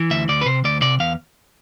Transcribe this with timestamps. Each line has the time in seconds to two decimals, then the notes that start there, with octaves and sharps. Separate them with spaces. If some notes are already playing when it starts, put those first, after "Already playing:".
Already playing: E3
0.11 D2 E5
0.28 D2 D5
0.41 B4
0.46 C3 C5
0.64 D2 D5
0.82 C3 D5
1.00 E2 F5